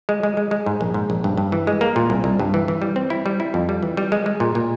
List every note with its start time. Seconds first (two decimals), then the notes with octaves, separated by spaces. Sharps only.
0.09 G#3
0.23 G#3
0.37 G#3
0.51 G#3
0.66 G#2
0.81 A#1
0.94 G#2
1.10 A#1
1.24 G2
1.37 G2
1.52 E3
1.67 G#3
1.81 A#3
1.96 A#2
2.10 C2
2.24 C2
2.39 G2
2.54 E3
2.68 E3
2.82 G3
2.96 C4
3.10 E4
3.26 G3
3.40 E4
3.54 F2
3.69 G3
3.83 E3
3.97 G3
4.12 G#3
4.26 G#3
4.40 A#2
4.55 A#2